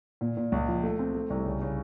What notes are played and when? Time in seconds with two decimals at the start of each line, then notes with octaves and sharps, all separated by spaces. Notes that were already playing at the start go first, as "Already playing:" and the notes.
0.21 A#2
0.37 A#2
0.52 C#2
0.68 F3
0.83 A3
0.99 C4
1.14 A3
1.30 C2
1.45 C#3
1.61 C#3